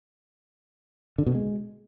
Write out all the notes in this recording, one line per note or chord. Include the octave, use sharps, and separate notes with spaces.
D3
B2
G#3